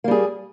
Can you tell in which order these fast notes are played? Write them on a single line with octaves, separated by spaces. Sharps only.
A#3 G3 G#4